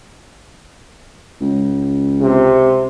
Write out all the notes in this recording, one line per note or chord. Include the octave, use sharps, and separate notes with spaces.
C#2
C3